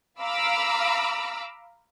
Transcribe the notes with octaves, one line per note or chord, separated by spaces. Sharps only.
F5 A#5 B5 D6 E6 F6